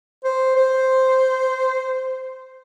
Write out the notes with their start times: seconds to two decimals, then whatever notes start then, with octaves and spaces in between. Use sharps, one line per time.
0.24 C5
0.56 C5